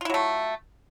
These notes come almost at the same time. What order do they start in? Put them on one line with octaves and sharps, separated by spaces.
F4 E4 F#3 A3